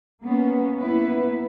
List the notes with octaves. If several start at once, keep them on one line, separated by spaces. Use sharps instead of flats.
A#3 B3 C#4
A#3 B3 E4 B4